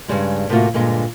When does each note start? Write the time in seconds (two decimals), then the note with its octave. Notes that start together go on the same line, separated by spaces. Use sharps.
0.08 G2 C#3 G3 G#3
0.49 A2 C3 A#3 C4 F4 F#4
0.74 G2 A#2 D3 G#3